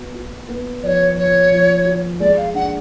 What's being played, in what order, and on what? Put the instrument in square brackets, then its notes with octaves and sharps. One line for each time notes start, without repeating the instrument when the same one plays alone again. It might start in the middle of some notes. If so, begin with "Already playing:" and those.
Already playing: [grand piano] B3 F#4
F#4
B3
[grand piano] F3 [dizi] C#5 D5
[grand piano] F3 [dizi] C#5
[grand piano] F3
F#4
[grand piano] G#3 [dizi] D5
[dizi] F5
[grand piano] D4 [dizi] F#5